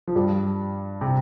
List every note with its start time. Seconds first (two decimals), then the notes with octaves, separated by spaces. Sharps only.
0.07 F3
0.15 G2 G3
1.01 C3